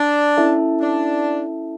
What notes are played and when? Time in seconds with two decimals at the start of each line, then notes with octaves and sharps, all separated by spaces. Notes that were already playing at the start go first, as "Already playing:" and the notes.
Already playing: D4
0.37 C#4 E4 A4 E5 A5
0.81 D4